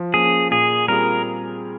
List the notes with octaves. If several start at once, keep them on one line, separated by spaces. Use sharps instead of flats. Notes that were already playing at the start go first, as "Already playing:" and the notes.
Already playing: F3
A#3 C#4 G#4
A#2 G#4
G3 C4 F4 G#4 A#4